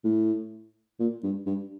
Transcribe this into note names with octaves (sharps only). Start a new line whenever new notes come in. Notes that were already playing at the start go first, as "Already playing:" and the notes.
A2
A#2
G2
G2